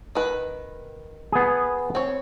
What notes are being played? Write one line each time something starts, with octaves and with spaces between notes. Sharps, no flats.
D#3 B4
B3 G#4
C4 C#5